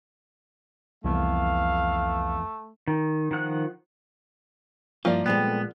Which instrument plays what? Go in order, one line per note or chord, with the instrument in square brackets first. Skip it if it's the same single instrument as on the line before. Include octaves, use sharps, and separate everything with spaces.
[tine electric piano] C2 [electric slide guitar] F2 E3 B3 [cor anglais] A3 [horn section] F5
[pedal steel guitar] D#3
D#3 F3 F#5 F#6
[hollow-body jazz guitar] G2 E4 F4 [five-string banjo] F3 A#3 D5 [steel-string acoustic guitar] A#5
[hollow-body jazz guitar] A#2 G#3 [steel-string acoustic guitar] G3 C4 A4 [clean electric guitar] B3